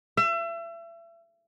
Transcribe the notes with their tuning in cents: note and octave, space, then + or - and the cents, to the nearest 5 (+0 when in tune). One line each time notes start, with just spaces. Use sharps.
E5 +35